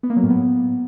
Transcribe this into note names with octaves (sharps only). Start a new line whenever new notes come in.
B3
A#3
F#3
A2
B3